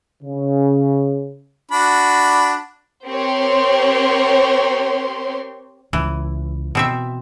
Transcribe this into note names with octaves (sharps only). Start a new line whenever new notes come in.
C#3
D4 F#4 B5
C4 G4 A#4 C5 C#5 C6
C#2 E3
B2 C4 E5